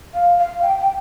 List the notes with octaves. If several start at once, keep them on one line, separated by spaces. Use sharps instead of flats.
F5
F5
G5
G5